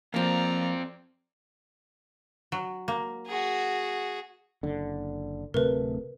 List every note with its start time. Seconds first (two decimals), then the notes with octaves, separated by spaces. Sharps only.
0.14 F2 F3 A#3 C4 D5 A#5
2.52 F#3
2.88 A#3
3.27 F#4 G#4
4.63 F#1 D3
5.54 D1 C3 A3 A#4 B4